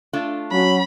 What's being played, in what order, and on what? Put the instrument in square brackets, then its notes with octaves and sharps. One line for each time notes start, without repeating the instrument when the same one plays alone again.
[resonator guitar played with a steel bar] A3 D4 F4
[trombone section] F#3 [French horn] C#4 [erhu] B5